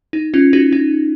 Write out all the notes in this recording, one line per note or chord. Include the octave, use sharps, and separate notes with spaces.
D#4
C#4 F4
D#4 F#4
D#4